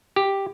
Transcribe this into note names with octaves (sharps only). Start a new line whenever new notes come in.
G4